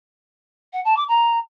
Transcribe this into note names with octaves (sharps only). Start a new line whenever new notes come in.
F#5
A5
D6
A#5